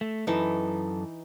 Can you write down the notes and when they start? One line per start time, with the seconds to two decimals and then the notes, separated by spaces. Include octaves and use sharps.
0.01 A3
0.27 F#2 E3 D#4 A4